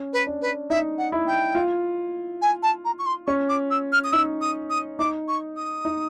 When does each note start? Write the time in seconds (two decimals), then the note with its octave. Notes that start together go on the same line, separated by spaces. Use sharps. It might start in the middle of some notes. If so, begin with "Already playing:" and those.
Already playing: C#4
0.13 B4
0.27 D4
0.41 B4
0.70 D#4 E5
0.98 F#5
1.12 E4
1.27 G5
1.55 F4
2.41 G#5
2.62 A5
2.85 A#5
2.98 C#6
3.06 C6
3.26 C#4 C#6
3.49 D6
3.70 E6
3.92 F6
4.04 D#6
4.12 D#4 E6
4.41 D#6
4.70 D#6
4.99 D#4 D6
5.28 C#6
5.56 D#6
5.85 D#4